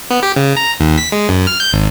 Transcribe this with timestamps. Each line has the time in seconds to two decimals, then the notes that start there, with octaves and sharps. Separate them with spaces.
0.10 B3
0.23 G4
0.36 C#3
0.57 A#5
0.80 D#2
0.98 B6
1.12 G#3
1.29 F#2
1.47 F6
1.60 G6
1.73 G#1